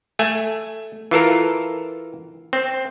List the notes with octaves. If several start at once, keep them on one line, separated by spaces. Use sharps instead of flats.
A3 G#5
E3 F4 A4 A#4
C4